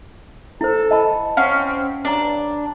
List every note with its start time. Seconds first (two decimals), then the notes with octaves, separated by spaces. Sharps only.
0.61 E4 A4 C5
0.91 D#5 A5 B5
1.37 C4 C#4 F5 F#5
2.05 G2 D4 C#5 A#5